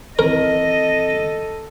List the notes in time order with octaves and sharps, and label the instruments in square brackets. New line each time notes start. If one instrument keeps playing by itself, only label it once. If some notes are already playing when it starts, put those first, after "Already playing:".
[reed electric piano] D#3 E3 C4 [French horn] A4 [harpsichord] A#4 [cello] D#5